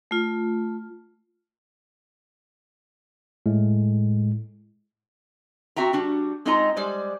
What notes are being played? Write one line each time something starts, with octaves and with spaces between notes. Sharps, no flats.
A3 F4
A2 G#3
C4 F#4 E5 G5 A#5
G3 D4 F#4
G#3 C4 D#4 F4 D#5 A#5
G3 G#3 C5 D5